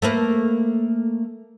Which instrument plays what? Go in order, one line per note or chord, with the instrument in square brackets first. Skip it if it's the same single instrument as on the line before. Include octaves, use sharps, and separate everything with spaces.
[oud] A3 A#3 B4